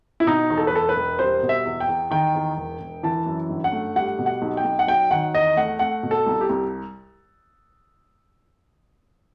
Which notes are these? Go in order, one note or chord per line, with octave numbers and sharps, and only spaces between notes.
E4
B2 D#4
E2
A4
B4
E1 A4
B4
E1
G3 C5
B2
E5
E2
G5
E2
D#3 G5
E2
E1
E1
E3 A5
F#2
G1
F#5
A3
G3 F#5
B2
F#5
B1
G5
B1
F#5
F#3 G5
D#3 F#5
E2 D#5
A3 F#5
A3 F#5
B2
A4
C2
G4
C2